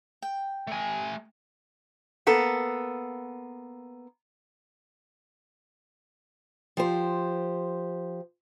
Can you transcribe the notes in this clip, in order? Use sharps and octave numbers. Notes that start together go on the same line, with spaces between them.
G5
A3 G#5
A#3 B3 A4
F3 G4 C5